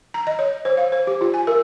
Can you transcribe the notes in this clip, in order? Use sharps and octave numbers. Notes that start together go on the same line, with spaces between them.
A#5
D#5
C#5
C5
F5
C5
G4
F4
G#5
A#4